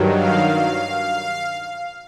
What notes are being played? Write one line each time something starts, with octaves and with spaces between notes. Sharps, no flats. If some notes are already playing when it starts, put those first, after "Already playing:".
Already playing: G2 D#3 F#3
F5